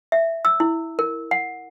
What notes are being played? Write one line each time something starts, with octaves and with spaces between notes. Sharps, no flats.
E5
E6
E4
A#4
F#5